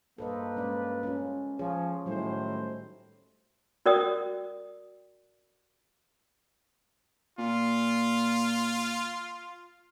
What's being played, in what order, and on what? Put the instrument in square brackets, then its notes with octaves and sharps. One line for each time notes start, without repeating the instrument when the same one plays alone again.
[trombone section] G2 A#3 B4 [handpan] A4 C5 D#5
[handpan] G#3 C#4 D5
C#4 F4
[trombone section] F3 [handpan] G#4 C#5
[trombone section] A2 D#3 C5 [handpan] F#3 G3 E4
[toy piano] F#4 A#4 D5 G5 D#6
[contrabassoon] A#2 [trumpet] F4